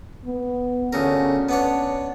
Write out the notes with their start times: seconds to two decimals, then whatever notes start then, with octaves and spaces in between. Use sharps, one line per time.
0.25 B3
0.93 D2 C#3 C#4 A#4
1.49 B3 D4 C#5